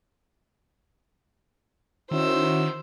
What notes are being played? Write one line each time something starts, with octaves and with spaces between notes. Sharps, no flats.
D#3 C#4 E4 F#4 C5 E6